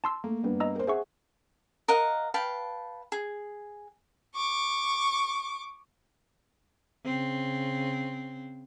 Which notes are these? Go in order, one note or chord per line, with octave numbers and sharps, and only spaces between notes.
A5 C6 E6
A3 A#3
G2 B3
D#5 A#5 E6
A#4 C5
G#4 C5 E5 F#5 C#6
A#4 D#5 F5 F#5
B4 F5 G5 A5
G#4
C#6 D6
C#3 C4